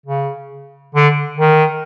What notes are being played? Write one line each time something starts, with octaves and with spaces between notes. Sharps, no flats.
C#3
D3
D#3